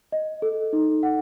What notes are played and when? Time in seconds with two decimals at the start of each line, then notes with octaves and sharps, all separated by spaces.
0.12 D#5
0.42 A4
0.73 D#4
1.03 F#5